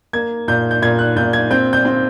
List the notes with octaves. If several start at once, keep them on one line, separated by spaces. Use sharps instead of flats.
A#3 G#6
A#2 G6
G6
A#2 G#6
F#6
A#2 G6
G#6
C4 G6
G6
C4